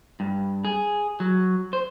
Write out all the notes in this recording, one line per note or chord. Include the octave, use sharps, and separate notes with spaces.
G2
G#4
F#3
C5